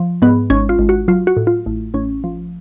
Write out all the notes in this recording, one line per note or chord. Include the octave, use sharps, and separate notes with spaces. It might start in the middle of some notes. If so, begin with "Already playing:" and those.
Already playing: F3
G#2 B3
G#1 C#4
F4
G#1
F#4
F#3 F4
F#4
A2
F4
A1
A1 C#4
F3